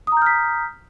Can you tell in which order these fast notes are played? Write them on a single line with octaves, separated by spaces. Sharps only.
D#6 A#5 G6 F6 B6